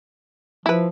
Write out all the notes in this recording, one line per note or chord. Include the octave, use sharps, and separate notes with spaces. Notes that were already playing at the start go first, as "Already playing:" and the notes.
F3 E4 B4